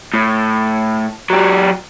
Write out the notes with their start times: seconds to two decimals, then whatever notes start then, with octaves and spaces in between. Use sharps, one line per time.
0.14 A2
1.30 F#3 G4